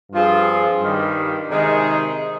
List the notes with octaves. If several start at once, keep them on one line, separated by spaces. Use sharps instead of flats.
G2 F3 C4 F4 G#4
G2 D#3 G3
C3 D#3 G#3 D#4 G#4